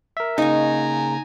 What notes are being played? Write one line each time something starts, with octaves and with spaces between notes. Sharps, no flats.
A#4 E5
C#3 A#3 D#4 G#5 A#5 C#6